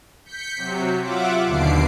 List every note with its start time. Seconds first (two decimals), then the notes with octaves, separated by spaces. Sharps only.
0.25 G6 B6 C#7
0.57 C3 F#3
1.01 F4 E5 F#5 D6
1.46 D#2 B2 D3 C7 D7